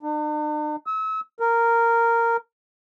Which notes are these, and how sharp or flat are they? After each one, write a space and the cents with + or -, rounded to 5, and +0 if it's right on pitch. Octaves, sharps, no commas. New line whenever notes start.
D4 +45
E6 -35
A#4 -10